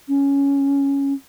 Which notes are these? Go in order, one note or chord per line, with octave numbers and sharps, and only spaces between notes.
C#4